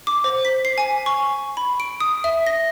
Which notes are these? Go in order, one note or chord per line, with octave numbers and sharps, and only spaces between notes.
D6
C5
B6
C7
G#5
C#6
B5
D7
D#6
E5
A#6